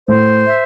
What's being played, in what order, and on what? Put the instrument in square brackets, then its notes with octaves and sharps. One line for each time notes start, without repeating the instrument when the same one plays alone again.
[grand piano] A2 [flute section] C5
[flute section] E5